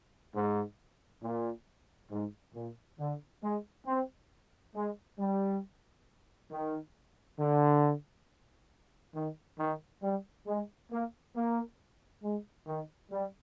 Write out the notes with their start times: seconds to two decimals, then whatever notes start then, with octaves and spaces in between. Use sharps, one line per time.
0.35 G#2
1.23 A#2
2.11 G#2
2.55 A#2
2.99 D3
3.43 G#3
3.87 C4
4.75 G#3
5.19 G3
6.51 D#3
7.39 D3
9.15 D#3
9.59 D#3
10.03 G3
10.46 G#3
10.91 A#3
11.34 A#3
12.23 G#3
12.67 D#3
13.11 G3